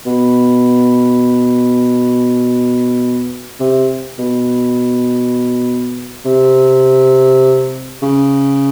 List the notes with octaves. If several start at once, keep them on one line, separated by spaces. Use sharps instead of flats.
B2
C3
B2
C3
C#3